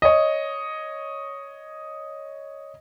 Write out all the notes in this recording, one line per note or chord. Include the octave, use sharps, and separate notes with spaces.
C#5 D#5